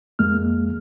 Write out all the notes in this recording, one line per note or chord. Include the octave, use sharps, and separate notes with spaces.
F2 G#3 A#3 F6